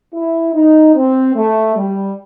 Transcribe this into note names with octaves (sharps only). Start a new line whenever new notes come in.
E4
D#4
C4
A3
G3